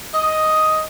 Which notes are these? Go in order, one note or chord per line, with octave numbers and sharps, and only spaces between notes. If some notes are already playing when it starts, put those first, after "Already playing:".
D#5